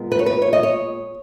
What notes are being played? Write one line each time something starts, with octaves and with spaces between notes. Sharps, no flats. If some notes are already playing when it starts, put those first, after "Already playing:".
Already playing: A#2 G#3 B3
B4
C#5
B4
C#5
D#5
C#5